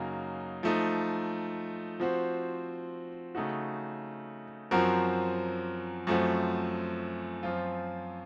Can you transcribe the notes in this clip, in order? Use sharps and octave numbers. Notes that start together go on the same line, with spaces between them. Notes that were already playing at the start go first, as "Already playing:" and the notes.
Already playing: F#2 C#3 F#3 A#3 D#4
F3 A3 D#4
F3 C4 F#4
C#3 A3 D#4 F#4
F#2 F3 C4 F#4 A#4
F#2 F3 A3 C4 F#4
F#2 F3 C4 F4